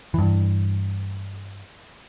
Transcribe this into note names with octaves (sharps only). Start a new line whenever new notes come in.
G2 E3